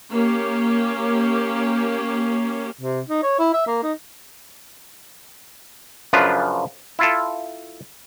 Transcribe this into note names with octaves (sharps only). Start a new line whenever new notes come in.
A#3 C#4 G4
C3
D#4
C#5
E4
E5
A#3
D#4
F#2 C#3 F3 D4 F4 B4
E4 F4 A4